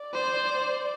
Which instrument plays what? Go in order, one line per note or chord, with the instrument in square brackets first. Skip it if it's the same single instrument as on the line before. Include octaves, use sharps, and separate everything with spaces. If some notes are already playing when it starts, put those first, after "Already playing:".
Already playing: [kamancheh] D5
[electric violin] C5